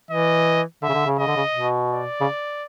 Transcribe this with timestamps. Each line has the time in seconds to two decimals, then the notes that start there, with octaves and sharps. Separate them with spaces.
0.11 E3 D#5
0.83 D3 E5
0.89 C#3
0.94 D3
1.06 C#3
1.19 C#3 D#5
1.27 D3
1.36 C#3
1.55 B2
1.91 D5
2.21 C#3